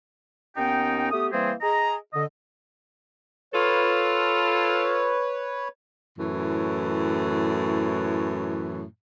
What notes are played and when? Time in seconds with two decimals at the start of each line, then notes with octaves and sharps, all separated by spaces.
0.56 D#2 B3 C#4 D#4 G5
1.11 A3 B3 G4 D#6
1.32 E3 G3 A#3 C4 G#4 C5
1.61 G#4 D#5 A#5
2.14 D3 D#5
3.53 F4 A4 B4 C#5
6.18 F#2 A2 E3